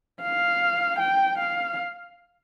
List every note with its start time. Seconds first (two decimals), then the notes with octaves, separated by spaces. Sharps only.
0.22 F5
0.99 G5
1.38 F5